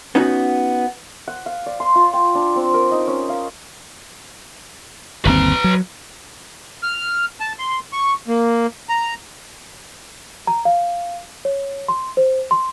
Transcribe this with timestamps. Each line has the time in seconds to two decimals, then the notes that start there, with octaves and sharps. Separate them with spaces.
0.15 B3 C#4 D#4 F#4
1.28 F#5
1.46 F5
1.66 D5
1.80 C6
1.95 F4
2.13 G5
2.35 D4
2.55 C4
2.74 A#4
2.91 D#4
3.07 C#4
3.29 F5
5.25 G1 D#2 C4 B4 A#5
5.64 F#3
6.83 F6
7.40 A5
7.58 C6
7.92 C#6
8.28 A#3
8.89 A#5
10.47 A#5
10.65 F5
11.45 C#5
11.88 C6
12.17 C5
12.51 C6